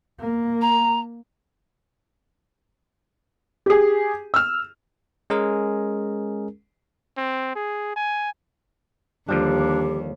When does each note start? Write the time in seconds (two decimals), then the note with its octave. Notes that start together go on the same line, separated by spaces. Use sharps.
0.20 A#3
0.62 A#5
3.66 G4 G#4
4.34 E6 F6
5.30 G#3 C#4 G#4 A#4
7.17 C4
7.55 G#4
7.96 G#5
9.29 D#2 D3 F3 G3 D4 G4